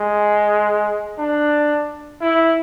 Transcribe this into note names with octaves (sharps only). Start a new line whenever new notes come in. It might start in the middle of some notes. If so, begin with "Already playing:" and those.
Already playing: G#3
D4
E4